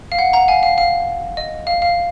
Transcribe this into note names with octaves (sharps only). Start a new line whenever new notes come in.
F5
F#5
F#5 A#5
F5 G#5
F5
F5
D#5
F5
F5